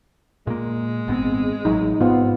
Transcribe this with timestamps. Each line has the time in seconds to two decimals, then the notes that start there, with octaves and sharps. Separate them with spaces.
0.47 A#2 G#3 A#3
1.08 G#1 B3 C4
1.65 A1 F#3 D#4
2.00 G#2 C3 B3 F4